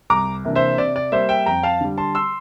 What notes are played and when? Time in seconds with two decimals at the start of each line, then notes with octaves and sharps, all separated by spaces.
0.10 C2 A#5 D6
0.44 C3 E3 A#3 D4
0.56 C5 E5
0.78 C3 D5
0.96 D5
1.12 G3 A#3 C5 E5
1.29 E5 G5
1.46 F2 G5 A#5
1.63 F5 A5
1.81 D3 G3
1.98 A5 C6
2.15 C6 E6